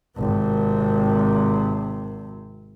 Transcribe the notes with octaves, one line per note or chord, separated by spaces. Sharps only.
G#1 C3